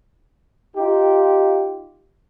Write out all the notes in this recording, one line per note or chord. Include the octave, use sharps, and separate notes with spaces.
D#4 F4 G4